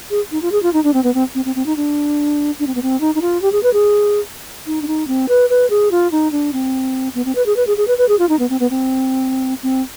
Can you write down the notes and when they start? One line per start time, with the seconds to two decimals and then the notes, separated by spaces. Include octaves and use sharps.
0.11 G#4
0.31 D#4
0.42 F4
0.52 G#4
0.63 F4
0.73 D#4
0.84 D4
0.94 C4
1.04 B3
1.14 C4
1.35 C4
1.45 C4
1.55 C4
1.66 D#4
1.76 D4
2.59 D4
2.67 C4
2.75 B3
2.82 C4
3.00 D#4
3.15 D#4
3.22 F4
3.42 G4
3.52 G#4
3.63 B4
3.73 G#4
4.66 D#4
4.82 D4
4.87 D#4
5.07 C4
5.28 B4
5.50 B4
5.70 G#4
5.91 F4
6.12 D#4
6.32 D4
6.53 C4
7.15 B3
7.25 C4
7.35 B4
7.46 G#4
7.56 B4
7.67 G#4
7.77 G#4
7.87 B4
7.98 B4
8.08 G#4
8.19 F4
8.29 D#4
8.39 B3
8.50 C4
8.60 B3
8.70 C4
9.63 C4